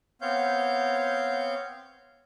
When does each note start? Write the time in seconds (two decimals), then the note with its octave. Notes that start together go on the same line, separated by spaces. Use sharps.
0.21 B3 C4 C#5 F5 G6